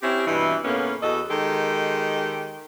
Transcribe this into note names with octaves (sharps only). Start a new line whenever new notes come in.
C4 C#4 E4 G4
G2 B2 E3
A2 C#3 A#3 B3 C#4
E2 F#4 A4 D#5
D#3 G#3 G4 A4